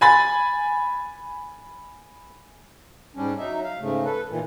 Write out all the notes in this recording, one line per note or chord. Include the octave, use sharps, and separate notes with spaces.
G#5 B5 A6
G#2 G3 C#4 D4
F#3 D#4 E5
F5
G#2 C#3 A3
A4 B4
A#2 D#3 E3